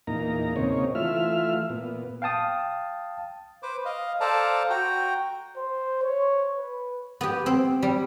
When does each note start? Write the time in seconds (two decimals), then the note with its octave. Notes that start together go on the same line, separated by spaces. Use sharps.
0.07 E2 A#2 A#3 D#4 A#5
0.56 C#3 A#3 C4 D#4 C#5
0.95 E3 A3 F4 E5 F6
1.69 A#2 B3
2.22 F5 G5 A5 D#6
3.63 B4 C5 D6
3.85 D#5 F5
4.20 A4 C5 D5 F5 A5 A#5
4.70 F#4 G5 A#5
5.57 C5
6.03 C#5
6.57 B4
7.21 B3 G4
7.46 C4
7.83 G3